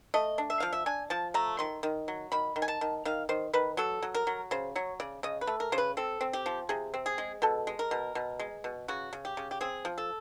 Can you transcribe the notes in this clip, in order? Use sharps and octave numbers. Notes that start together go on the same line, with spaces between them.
A3 D#5
D4
E5
F3 F5
E5
D4 G#5
F3 A5
A3 A#5
D#3 C6
D#3
F#3
D#3 B5
D#3
G#5
A5
D#3
D#3 F5
D#3 C5
D#3 B4
F#3 A4
F#3
A#4
F#3
C#3 C5
F#3 C#5
C#3 D5
C#3 D#5
B4
A3
A#4
C#3 C5
B4
C4 A4
C4
G4
F3
C3 G#4
C4
G#4
G#3
B2 A4
G#3
A#4
B2
B2
G#3
B2
C#3 F#4
C#3
G4
C#3
G4
C4 G#4
F3
A4